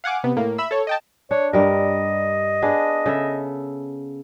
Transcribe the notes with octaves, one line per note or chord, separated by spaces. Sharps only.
F5 F#5 G#5 D6
C3 B3
A2 A#3
E5 B5 E6
A4 C#5
D#5 G5 A5
D4 C#5
G2 G3 A#4 D#5
B3 D4 G#4
C#3 A4 E5